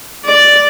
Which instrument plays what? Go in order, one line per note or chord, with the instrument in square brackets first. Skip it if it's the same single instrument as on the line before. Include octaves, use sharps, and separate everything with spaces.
[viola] D5